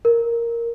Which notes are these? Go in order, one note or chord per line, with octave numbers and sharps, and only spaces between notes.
A#4